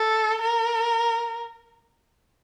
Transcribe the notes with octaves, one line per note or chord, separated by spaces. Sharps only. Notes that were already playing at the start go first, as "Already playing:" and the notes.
Already playing: A4
A#4